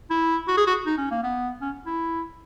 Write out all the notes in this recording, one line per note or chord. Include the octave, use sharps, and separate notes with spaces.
E4
F#4
G#4
F#4
D#4
C#4
A#3
B3
C#4
E4